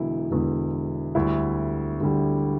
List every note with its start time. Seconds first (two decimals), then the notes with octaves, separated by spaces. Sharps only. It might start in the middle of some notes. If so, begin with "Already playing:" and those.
Already playing: E1 E2 D3 E4
0.30 E1 E2 D3
1.15 D2 D3 G3 E4
2.00 D2 D3 G3